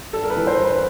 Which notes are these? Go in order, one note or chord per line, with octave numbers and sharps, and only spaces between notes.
G2 A4
A#4
B4
E3
C5
G2
B4